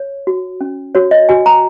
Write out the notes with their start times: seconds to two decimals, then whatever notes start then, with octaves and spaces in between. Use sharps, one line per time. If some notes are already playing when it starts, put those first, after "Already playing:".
Already playing: C#5
0.27 F#4
0.61 C#4
0.95 F#4 C#5
1.11 D#5
1.29 F#4 G#5
1.46 A#5